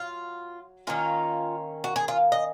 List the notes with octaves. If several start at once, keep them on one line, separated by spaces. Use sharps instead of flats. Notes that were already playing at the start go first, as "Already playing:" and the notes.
Already playing: F#3 F4
D#3 A#3 C#4 F4
F#4
G#4
F4
D#5